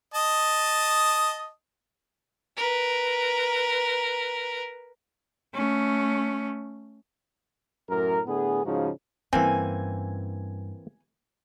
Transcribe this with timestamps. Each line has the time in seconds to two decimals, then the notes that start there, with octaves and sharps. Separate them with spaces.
0.14 D#5 A5 D#6
2.57 A#4 B4
5.54 A3 C#4
7.90 F#2 A2 A#4
8.27 A2 D3 B3 G#4
8.64 G#2 C#3 F3 D#4 F#4
9.33 G2 E3 A#3 C4 C#4 G#5